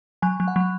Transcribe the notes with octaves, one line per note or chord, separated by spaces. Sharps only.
F#3 G#5
F#3
F#5
F#3